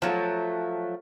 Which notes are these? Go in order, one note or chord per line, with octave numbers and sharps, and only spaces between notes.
F3 F#3 A3